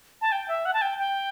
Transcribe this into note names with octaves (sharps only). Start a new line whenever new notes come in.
A5
G5
E5
F#5
A5
G5
G5